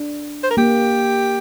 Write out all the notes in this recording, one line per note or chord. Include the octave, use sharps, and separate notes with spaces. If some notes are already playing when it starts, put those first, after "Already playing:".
Already playing: D4
C5
A#4
A#3 G4